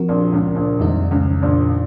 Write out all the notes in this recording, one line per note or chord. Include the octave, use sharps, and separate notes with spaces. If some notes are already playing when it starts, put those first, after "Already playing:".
Already playing: F3 C4 F#4 A#4
A#1 A#2
C#2 C#3
A#1 A#2
C2 F2 C3 D#3 G#3 D#4
C#2 C#3
A#1 A#2